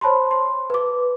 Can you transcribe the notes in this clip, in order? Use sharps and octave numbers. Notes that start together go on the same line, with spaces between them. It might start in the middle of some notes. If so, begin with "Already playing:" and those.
C5 C#5 A5 B5 C6
C6
B4 D6